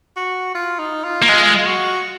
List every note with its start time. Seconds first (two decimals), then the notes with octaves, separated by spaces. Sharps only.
0.16 F#4
0.55 F4
0.79 D#4
1.04 F4
1.22 A#3
1.29 G#3 F4
1.58 F4
1.66 F#4